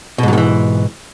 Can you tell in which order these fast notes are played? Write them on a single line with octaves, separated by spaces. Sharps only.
B2 G#2 F#3 D#3 E3